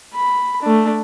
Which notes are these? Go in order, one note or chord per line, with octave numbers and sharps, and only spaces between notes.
B5
A3 D4